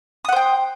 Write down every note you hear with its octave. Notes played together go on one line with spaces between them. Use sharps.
C5 F#5 G5 D#6